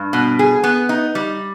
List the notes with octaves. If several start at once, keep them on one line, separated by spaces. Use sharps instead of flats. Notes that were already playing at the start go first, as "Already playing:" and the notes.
Already playing: G2
B2
G#4
B3
D#4
G3